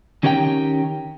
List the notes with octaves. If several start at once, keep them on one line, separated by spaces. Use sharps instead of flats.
D#3 C#4 G4 A#4 F#5 G5